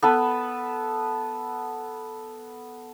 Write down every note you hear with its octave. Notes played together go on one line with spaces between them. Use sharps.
B3 A4 B4